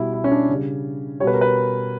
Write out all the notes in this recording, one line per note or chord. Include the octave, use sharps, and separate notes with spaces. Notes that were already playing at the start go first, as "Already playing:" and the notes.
Already playing: B2 G3 E4
E4
C#4
D4
C#3 G3
B2 G3 B4 C#5
A#4
B4